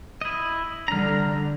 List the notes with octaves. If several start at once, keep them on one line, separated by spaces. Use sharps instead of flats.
E4 D#5
D3 G3 A#5 F6